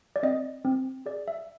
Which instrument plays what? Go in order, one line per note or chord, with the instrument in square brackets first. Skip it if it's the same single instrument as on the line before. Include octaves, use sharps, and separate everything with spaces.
[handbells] D5
C4 D#5
C4
G#4 D5
E5